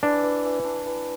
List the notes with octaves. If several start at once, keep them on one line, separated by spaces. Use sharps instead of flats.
E3 D4
E3
E3
D4
E3